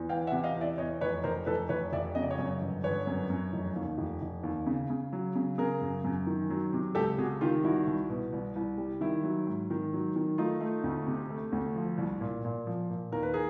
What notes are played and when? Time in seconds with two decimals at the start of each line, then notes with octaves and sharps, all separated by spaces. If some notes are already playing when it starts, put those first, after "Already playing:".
Already playing: E2
0.09 E3 F5 G5
0.27 E5 F#5
0.32 C3
0.44 D#5 F5
0.56 E2
0.61 D5 E5
0.78 E2 C#5 D#5
1.01 F1 B4 C#5
1.24 F1 A#4 C5
1.46 F1 A4 B4
1.69 F1 B4 C#5
1.92 F1 D5 E5
2.15 C#3 D#5
2.22 D5
2.30 C#5 D#5
2.38 F#2
2.62 G1
2.83 G1 B4 C#5
3.07 F#2
3.30 F#2
3.53 F1
3.76 D#2
3.98 F1
4.22 F1
4.43 D#2
4.67 C#3
4.90 C#3
5.13 F#3
5.36 C#3
5.58 C#3 G#4 A#4
5.81 F#2
6.04 F#2
6.27 D#3
6.50 F#3
6.73 C3
6.95 C#2 G4 A4
7.18 C3 F#4 G#4
7.41 D#3 F4 G4
7.63 C2 E4 F#4
7.87 C2
8.10 B2
8.33 C2
8.55 C2
8.78 G3
9.01 D#3 E4
9.23 F#3
9.47 G#2
9.70 D#3
9.93 F#3
10.16 D#3
10.38 A3 D#4 F4
10.61 A3
10.84 D2
11.07 C3
11.30 A3
11.52 D2
11.76 F3
11.98 C2
12.21 A#2
12.45 A#2
12.67 F3
12.90 A#2
13.12 D#2 A#4
13.23 B4
13.34 G#4 A#4